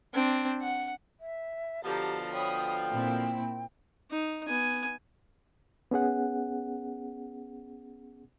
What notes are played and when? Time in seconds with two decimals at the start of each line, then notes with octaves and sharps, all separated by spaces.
0.14 C4 D4
0.62 F#5
1.20 E5
1.84 B2 D3 F3 G4 A5 A#5
2.33 C#5 G5 B5 D#6
2.92 A#2 C4 E4
4.10 D#4
4.47 B3 G#5
5.91 B3 C#4 G#4 F#5